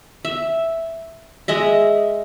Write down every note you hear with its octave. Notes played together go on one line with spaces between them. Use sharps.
E5
G#3 D#5 E5